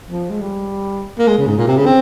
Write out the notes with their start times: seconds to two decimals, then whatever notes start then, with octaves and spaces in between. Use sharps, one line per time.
0.10 F3
0.30 G#3
0.41 G3
1.18 A#3
1.27 G#3
1.38 C#3
1.47 G#2
1.58 A#2
1.67 C3
1.77 C#3
1.86 C4